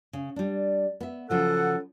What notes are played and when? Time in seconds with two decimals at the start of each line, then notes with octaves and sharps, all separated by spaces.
0.13 C#3
0.36 G3 D4
1.00 B3 E5
1.30 C#3 F3 F#3 A4 F#5